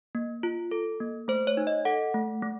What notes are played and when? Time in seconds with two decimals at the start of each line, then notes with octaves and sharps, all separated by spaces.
0.15 A#3
0.43 F4
0.71 A4
1.00 A#3
1.28 A3 C5
1.47 C#5
1.57 D#4
1.67 D#5
1.85 A4 F#5
2.14 A3
2.42 A3